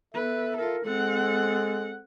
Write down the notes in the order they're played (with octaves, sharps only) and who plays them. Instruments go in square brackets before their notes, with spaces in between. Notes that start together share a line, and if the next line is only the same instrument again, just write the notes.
[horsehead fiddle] B3 B4 [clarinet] A4 [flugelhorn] E5
[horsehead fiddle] F4 A4 [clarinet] A#4
[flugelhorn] G#3 [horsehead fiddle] C4 F#5 [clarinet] A4